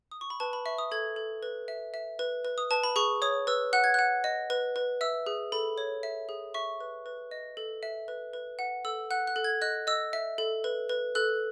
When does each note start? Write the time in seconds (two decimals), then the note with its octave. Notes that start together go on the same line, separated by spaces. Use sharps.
0.11 D#6
0.21 C#6
0.30 B5
0.40 B4 A5
0.53 B5
0.65 E5 C#6
0.78 D#6
0.92 A4 G#6
1.16 A4
1.43 B4
1.68 E5
1.94 E5
2.19 B4
2.45 B4
2.58 D#6
2.71 B4 A5
2.84 B5
2.96 G#4 C#6
3.22 C#5 D#6
3.47 B4 E6
3.73 F#5 F#6
3.84 G#6
3.94 F#5 F#6
4.24 D#5
4.50 B4
4.76 B4
5.01 E5 E6
5.26 G#4
5.52 A4 B5
5.78 C#5
6.03 E5
6.29 G#4
6.54 E5 C#6
6.81 B4
7.06 B4
7.31 D#5
7.57 A4
7.83 E5
8.08 B4
8.34 B4
8.59 F#5
8.85 A4 E6
9.11 F#5 F#6
9.27 F#6
9.36 A4
9.44 G#6
9.62 D#5 F#6
9.87 D#5 E6
10.13 E5
10.38 A4
10.64 B4
10.89 B4
11.15 A4 F#6